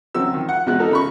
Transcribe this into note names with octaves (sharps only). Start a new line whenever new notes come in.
C#3 F#3 C4 E6
D#3
F#5
G#1 B2 G#3 B3 F#6
D#4 A4 A#4
C#3 B5 C#6